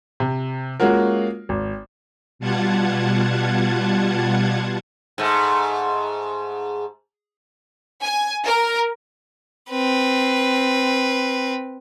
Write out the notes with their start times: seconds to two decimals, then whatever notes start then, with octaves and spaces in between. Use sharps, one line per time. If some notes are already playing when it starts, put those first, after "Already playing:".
0.20 C3
0.80 G#3 A#3 C#4 F4 F#4 A#4
1.49 G#1
2.39 B2 G3 F4 F#5 A5 G#6
5.18 G#2 A3
8.03 G#5
8.45 A#4
9.70 C4 B4